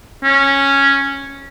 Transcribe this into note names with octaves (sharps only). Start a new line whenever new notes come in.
C#4